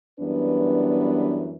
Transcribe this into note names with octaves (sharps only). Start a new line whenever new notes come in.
F#2 E3 G3 B3 D4 B4